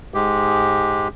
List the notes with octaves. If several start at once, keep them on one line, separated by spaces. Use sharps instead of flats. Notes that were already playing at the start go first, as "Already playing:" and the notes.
G#2 G#3 G4